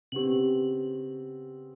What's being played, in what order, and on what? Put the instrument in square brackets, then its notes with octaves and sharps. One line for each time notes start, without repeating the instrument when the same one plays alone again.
[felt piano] C#3 B3 C4 [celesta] G4 F#7